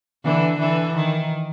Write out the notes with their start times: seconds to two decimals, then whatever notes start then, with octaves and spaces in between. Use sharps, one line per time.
0.24 D3 E3
0.59 D3 E3
0.95 D#3